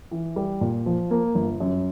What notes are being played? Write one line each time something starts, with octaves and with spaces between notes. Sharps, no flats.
E3
G3
A#2
F3
A#3
G1
F#2